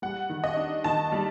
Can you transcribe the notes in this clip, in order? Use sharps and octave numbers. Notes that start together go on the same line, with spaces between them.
G3 F#5
D#3
D#5
D4
D#3 A5
G3